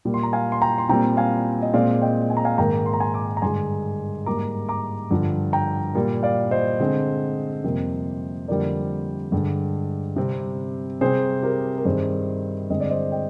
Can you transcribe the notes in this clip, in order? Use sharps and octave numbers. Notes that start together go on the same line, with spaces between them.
A#2 G3 A#3
C6
A#5
F5 G#5
C6
G5 A#5
C6
A#2 G3 C4 G5 A#5
F5 G#5
D#5
A#2 G#3 C4 D5 F5
D#5 G5
G#5
A#5
F5 G#5
G#2 D#3 A#3 G5 A#5
C6
A#5
G#5 C6
A#5 D6
A#5
G2 D3 G#3 G#5 C6
G#2 G3 A#3 A#5 D6
A#5 D6
G2 D3 F3
G5 A#5
A#2 G3 A#3
D5 F5
C5 D#5
D3 G#3 C4
F2 C3 G3 A#3
F2 D3 G3 A#3 A#4 D5
G2 D3 G#3
C3 G3 C4
C3 G3 C4 G#4 C5
G4 A#4
A#4
G2 D#3 G3 C4 G#4 C5
G2 D3 G#3 C4 D#5
D5
C5 D#5
D#5 G5